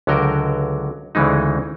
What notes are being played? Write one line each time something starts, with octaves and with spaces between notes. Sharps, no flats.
C#2 D3 F#3 F#4 A#4 G5
D2 C#3 E3 G#3 D#4